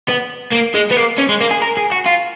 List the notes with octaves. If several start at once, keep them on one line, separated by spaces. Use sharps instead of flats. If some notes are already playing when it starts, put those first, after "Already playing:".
B3
A#3
G#3
B3
A#3
C#4
G#3
A#3
G#4
A#4
G#4
F#4
F4